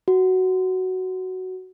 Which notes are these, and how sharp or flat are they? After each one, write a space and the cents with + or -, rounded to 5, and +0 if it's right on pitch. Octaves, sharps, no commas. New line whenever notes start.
F#4 +10